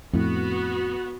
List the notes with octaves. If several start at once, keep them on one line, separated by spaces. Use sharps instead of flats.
F2 A2 B3 F#4